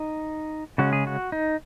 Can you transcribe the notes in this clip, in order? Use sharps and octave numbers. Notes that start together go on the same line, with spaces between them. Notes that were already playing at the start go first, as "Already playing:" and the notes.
Already playing: D#4
C#3 G#3 C#4 F#4
G#4
F#4
D#4